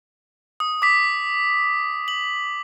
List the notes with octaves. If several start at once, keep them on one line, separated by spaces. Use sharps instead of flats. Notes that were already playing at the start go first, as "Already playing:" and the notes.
D#6
D6 B6
F#7